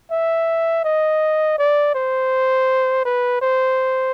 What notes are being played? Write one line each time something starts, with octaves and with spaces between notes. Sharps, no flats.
E5
D#5
D5
C5
B4
C5